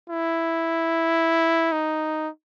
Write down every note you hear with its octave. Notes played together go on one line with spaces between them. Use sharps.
E4
D#4